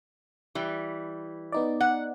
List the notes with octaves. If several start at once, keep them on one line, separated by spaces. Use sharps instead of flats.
E3 G3
B3 D#4 D5
F#5